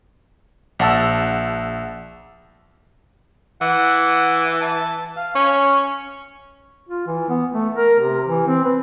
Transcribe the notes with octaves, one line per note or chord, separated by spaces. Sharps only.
A#1 F#5 A5 E6
E3 F#5
A5
F5
C#4 C#6
F4
E3
B3
A3
A#4
C3
E3
C4
B4